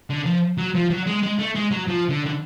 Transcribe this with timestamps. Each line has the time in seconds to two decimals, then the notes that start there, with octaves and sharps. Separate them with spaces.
0.10 D3
0.26 F3
0.58 F#3
0.75 F3
0.90 F#3
1.07 G#3
1.23 G#3
1.39 A3
1.55 G#3
1.71 F#3
1.88 F3
2.09 D3
2.26 D3